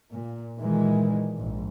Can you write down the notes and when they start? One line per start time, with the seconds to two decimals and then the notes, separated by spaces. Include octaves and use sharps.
0.12 A#2
0.59 A#2 D#3 E3 G#3
1.38 A#1 G#2